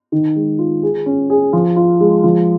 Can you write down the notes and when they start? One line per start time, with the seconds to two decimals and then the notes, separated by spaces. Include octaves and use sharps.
0.12 D#3
0.36 G#3
0.59 F4
0.83 G#4
1.06 C#4
1.30 G#4
1.53 F3
1.76 F4
2.00 G#3
2.23 F3